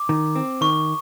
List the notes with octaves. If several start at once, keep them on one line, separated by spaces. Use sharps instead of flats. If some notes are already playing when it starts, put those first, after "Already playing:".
Already playing: D6
D#3
C4
D#3 C#6